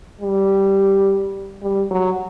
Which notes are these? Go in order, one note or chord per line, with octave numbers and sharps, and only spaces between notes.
G3
G3
F#3